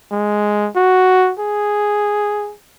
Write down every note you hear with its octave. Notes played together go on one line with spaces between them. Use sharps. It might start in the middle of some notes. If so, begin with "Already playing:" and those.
G#3
F#4
G#4